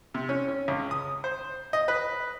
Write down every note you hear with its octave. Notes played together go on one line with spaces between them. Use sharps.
C3
C#4
C#4
C#2
D#6
C5
D#5
B4